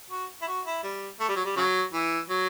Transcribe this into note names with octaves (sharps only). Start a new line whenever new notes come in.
F#4
E4
F#4
E4
G3
A3
G3
F#3
G3
C#3 F#3
E3
F#3